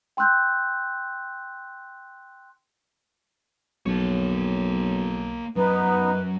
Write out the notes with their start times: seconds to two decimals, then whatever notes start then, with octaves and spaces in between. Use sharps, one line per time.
0.17 G5 C6 E6 F#6 G6
3.86 B1 A#3 C#5
5.56 F#2 B3 D#4 B4